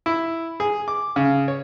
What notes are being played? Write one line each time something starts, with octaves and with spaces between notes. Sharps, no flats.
E4
G#4
D6
C#3
C#5